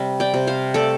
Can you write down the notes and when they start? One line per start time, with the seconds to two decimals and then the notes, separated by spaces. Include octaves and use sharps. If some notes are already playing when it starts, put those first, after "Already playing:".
Already playing: C3 G3
0.20 D5 G5
0.34 C3
0.47 C5 F5
0.74 A3 A4 D5